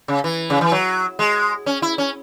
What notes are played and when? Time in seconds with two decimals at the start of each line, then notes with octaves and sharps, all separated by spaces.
0.08 C#3
0.24 E3
0.50 C#3
0.61 E3
0.72 F#3
1.19 G#3
1.66 C#4
1.82 E4
1.98 C#4